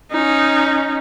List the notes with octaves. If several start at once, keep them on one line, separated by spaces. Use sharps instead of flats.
C#4 D#4